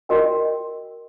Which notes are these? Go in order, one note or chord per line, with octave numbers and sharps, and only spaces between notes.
F#4 A#4 D#5 G5